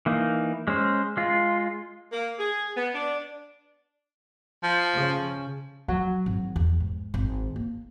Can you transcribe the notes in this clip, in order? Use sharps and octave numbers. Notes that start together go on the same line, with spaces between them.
E3 A#3 D#4
G#3 C#4 C5
G#3 F4
A#3
G#4
B3
D4
F3
C#3
F#3
G#1
E2
G#2
G#1
A#3